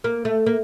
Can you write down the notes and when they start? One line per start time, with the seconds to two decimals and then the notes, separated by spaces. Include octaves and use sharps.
0.04 A#3
0.25 A3
0.46 A#3